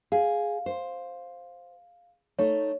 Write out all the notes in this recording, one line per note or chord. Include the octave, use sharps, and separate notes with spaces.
G#4 F5
C5
A3 D#4 C#5